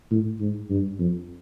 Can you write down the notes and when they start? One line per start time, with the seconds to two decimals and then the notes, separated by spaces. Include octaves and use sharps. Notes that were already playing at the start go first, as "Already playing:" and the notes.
0.11 A2
0.40 G#2
0.70 G2
0.99 F2